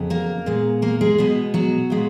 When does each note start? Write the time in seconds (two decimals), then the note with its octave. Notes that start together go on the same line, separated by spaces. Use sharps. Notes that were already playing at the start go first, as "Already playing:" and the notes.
Already playing: F2 C#3 F#3 B3
0.10 A#3 A#4
0.46 A#2 G#3 B3
0.82 A#3 A#4
1.01 G#3 G#4
1.18 B2 G#3 B3
1.54 F#3 F#4
1.90 A#2 G#3 B3